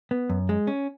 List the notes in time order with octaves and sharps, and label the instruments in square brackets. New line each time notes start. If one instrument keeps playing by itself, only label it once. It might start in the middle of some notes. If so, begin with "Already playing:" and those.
[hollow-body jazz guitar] B3
F#2
G#3
C#4